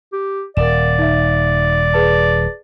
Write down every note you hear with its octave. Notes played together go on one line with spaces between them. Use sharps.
G4
D#1 A#4 D5 E7
D#4 E5
G#4 B4 A5